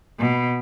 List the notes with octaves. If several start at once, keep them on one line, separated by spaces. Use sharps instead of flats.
B2